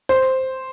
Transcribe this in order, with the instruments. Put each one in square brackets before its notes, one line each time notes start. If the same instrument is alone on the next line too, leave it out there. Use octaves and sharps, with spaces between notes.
[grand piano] C5